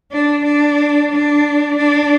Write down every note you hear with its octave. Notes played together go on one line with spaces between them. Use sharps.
D4
D4
D4
D4